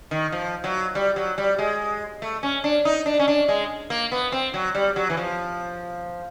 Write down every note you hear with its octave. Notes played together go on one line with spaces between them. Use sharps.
D#3
F3
F#3
G3
F#3
G3
G#3
A3
C#4
D4
D#4
D4
C#4
D4
G#3
A#3
B3
C4
F#3
G3
F#3
E3
F3